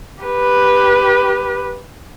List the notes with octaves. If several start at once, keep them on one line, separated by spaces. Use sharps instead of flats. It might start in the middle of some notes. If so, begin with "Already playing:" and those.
G4 B4